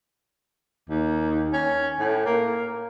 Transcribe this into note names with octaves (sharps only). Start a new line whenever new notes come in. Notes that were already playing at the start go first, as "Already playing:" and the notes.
D#2
C#4
A2
A#3